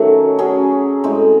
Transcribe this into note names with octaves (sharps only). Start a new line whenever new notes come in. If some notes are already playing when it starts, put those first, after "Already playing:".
Already playing: D#3 F#3 A3 C#4
F#3 C#4 G#4
A2 G#3 C4